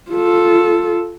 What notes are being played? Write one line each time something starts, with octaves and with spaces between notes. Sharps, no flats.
F4 A4